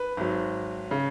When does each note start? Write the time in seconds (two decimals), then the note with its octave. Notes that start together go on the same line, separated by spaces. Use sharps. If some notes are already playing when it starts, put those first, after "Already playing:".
Already playing: B4
0.17 G#1 G#2 F#3
0.91 C#3